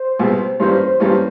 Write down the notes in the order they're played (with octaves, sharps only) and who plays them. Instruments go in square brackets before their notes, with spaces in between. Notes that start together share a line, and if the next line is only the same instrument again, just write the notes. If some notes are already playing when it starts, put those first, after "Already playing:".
Already playing: [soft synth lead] C5
[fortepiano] C2 B2 G#3
[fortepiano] G2 E3 G3 A#3 C#4 [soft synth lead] C5
[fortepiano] G2 E3 G3 A#3 C#4